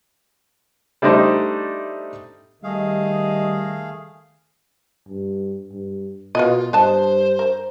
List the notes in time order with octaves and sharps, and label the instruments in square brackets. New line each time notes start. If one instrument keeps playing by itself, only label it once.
[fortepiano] G3 A3 D4 D#4 C5
[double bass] D#3 [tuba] G3 [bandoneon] A3 G#4 F5 [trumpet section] D#5
[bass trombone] G2
G2
[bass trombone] B2 [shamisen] A#3 F#4 D#5 [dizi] F4
[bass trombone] G2 [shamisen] D4 D#5 A5 [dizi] C5
[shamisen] A#4